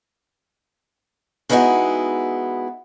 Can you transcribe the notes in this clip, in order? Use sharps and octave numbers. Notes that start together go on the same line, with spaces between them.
G#3 B3 D#4 E4 F#4 G#4